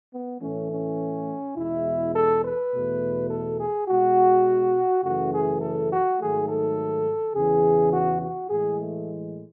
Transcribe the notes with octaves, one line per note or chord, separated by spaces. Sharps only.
B3
A2 E3 A3 C#4
C#4
E2 B2 G#3 E4
A4
B4
E2 B2 A3
A4
G#4
B2 G#3 F#4
F#2 C#3 E3 A3 F#4
G#4
A4
F#4
G#2 D#3 F#3 A3 G#4
A4
E2 C#3 E3 G#4
F#4
F#4
A2 E3 G#3 G#4
A3